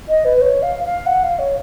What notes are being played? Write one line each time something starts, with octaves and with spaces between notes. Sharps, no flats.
D#5
B4
C#5
F5
F5
F#5
F5
C#5